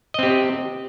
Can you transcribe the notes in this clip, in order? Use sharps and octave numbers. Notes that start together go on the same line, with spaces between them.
C4 G4 D#5